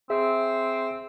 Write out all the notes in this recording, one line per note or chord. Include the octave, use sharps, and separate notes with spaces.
C4 G#4 E5